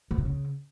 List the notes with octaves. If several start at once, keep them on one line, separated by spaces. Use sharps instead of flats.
E3
C3
C#3